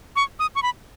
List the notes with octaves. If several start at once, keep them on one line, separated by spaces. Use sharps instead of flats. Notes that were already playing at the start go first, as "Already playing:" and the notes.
C#6
D#6
C#6
B5